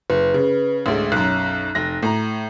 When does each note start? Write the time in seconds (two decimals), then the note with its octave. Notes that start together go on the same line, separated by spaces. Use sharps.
0.10 F#1 B4
0.34 C#3
0.86 A1 D2 G#3
1.12 B1 F#2 F#6
1.75 F1 A#6
2.03 A2 A#5